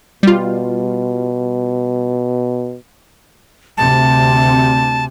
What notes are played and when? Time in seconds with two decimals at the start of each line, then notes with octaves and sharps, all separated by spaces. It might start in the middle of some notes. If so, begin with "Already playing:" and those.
0.23 B2 G3 F4
3.77 D2 C3 A5